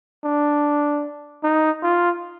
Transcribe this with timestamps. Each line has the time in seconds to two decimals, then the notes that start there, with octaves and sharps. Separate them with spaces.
0.25 D4
1.43 D#4
1.83 F4